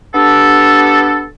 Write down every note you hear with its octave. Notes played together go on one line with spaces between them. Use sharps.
B3 D4 G4 A4